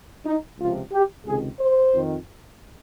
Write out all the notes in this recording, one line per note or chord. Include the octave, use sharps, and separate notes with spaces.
D#4
C#2 C3 F3 F4
G4
C#2 C3 D#3 G#4
C5
F2 D#3